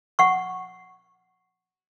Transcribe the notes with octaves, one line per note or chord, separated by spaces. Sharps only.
F#5 C#6